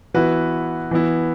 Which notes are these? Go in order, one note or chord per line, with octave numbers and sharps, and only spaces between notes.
E3 B3 E4 F#4 B4
E3 B3 E4